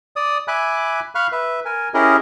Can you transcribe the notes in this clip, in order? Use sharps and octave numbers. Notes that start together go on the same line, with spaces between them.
D5 D#6
E5 G#5 B5 D6 F#6
F5 B5 C#6 F6 F#6
B4 E5
A#4 G#5
C#4 E4 G4 G#4 A#4 D#5